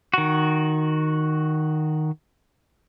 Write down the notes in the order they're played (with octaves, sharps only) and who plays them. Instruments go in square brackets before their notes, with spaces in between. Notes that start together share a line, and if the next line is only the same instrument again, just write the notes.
[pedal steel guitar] D#3 F#4